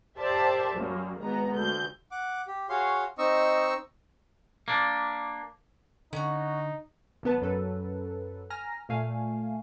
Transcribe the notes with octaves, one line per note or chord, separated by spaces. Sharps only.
G4 A#4 C5 D5 E5 A5
F#2 G3 A#3
G#1 G#3 B3 A#5
D2 G6
F#5 D6
G4
F#4 G#4 C#5 F5 C6
C4 D#4 D#5 C#6 E6
A#3 D4
D3 C#4 D#4 F#4
G#1 F#3 B3 B4 A5
F#2 F#3 A4 B4
G#5 A#5 F6 A#6
A#2 A3 F5 G#5